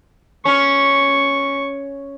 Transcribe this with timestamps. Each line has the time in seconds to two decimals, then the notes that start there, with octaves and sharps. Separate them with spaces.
0.45 C#4 C#6